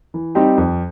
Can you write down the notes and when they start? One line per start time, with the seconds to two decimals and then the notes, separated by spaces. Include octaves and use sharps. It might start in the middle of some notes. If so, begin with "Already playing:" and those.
0.14 E3
0.35 G3 C4 D#4 G4
0.58 F2